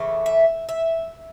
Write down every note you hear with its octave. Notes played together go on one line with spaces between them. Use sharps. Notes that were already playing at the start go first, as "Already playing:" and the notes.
Already playing: C#3 E3 A3
E5
E5